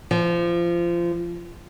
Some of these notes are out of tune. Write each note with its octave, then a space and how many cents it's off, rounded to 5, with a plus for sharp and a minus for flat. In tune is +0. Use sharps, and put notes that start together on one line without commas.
F3 -25